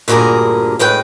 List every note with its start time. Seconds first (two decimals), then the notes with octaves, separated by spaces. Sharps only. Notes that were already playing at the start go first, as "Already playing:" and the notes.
0.08 D2 G2 A#2 D3 G#4 A#4
0.79 F#2 A2 G#3 B4 G5